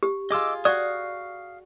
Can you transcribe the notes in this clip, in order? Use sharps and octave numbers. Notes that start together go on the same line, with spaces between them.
G4
F4 G#4 D#5 D6 E6
F#4 D5 F5 D#6